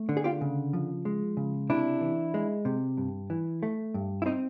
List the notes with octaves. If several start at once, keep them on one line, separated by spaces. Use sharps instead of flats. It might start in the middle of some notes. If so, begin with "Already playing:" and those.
Already playing: A3
D3
G#4
F4 G4
C#3
F3
G#3
C#3
C3 D4 E4
E3
G#3
C3
G2
E3
A3
G2
E4
C4 D#4